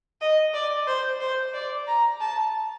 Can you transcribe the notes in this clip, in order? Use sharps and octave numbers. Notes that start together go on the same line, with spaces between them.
D#5
D5
C5
C5
D5
A#5
A5